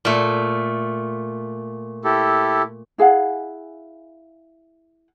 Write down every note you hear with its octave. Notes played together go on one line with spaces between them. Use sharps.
A#2 A3
E4 G4 A4
E4 G#4 F5 F#5